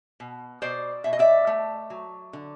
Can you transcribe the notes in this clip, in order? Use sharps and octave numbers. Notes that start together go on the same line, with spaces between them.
B2
B2 C5 D5
B2 E5
D#5
D5 E5
A3
F#3
D3